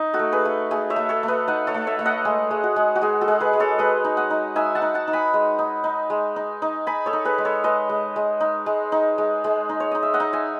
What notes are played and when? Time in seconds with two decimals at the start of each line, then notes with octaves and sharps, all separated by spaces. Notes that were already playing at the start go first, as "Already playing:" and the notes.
Already playing: D#4
0.14 F#4 A4
0.19 A3
0.32 G#4 B4
0.45 A3
0.71 A3 G#4
0.90 C#5 E5
0.96 A3
1.09 A4 C#5
1.23 A3
1.28 B4 D#5
1.47 D#4 D#5 F#5
1.67 A4 C#5
1.74 A3
1.87 C#5 E5
1.99 A3
2.05 D#5 F#5
2.25 G#3 G#4
2.51 G#3
2.63 F#4
2.76 G#3
2.96 F#4
3.01 G#3 G#4
3.21 F#4 A4
3.28 G#3
3.40 G#4 B4
3.53 G#3
3.60 A4 C#5
3.78 G#3 B4 D#5
4.04 D#4
4.17 D#5 F#5
4.30 D#4
4.56 D#4 E5 G#5
4.75 F#5 A5
4.82 D#4
4.94 F#5 A5
5.07 D#4
5.13 G#5 B5
5.34 G#3
5.59 D#4
5.84 D#4
6.10 G#3
6.36 D#4
6.62 D#4
6.87 D#4 G#5 B5
7.06 A4 C#5
7.13 D#4
7.25 G#4 B4
7.38 G#3
7.45 A4 C#5
7.64 G#3 B4 D#5
7.89 G#3
8.16 G#3
8.40 D#4
8.66 G#3
8.92 D#4
9.18 G#3
9.44 G#3
9.69 D#4
9.80 C#5
9.91 D#4 D#5
10.03 E5
10.14 D#5 F#5
10.20 D#4
10.33 E5 G#5